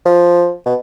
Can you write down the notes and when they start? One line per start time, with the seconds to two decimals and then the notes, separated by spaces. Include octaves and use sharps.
0.05 F3
0.66 B2